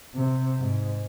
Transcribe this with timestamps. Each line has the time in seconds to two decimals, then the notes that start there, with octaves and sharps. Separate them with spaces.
0.15 C3
0.58 G#2